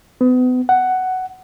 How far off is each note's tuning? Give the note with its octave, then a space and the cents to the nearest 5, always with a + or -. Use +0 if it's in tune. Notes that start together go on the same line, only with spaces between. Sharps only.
B3 +35
F#5 +10